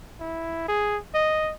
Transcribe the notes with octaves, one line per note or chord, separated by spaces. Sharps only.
E4
G#4
D#5